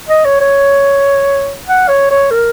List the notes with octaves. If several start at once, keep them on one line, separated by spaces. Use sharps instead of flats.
D#5
C#5
C#5
F#5
C#5
C#5
A#4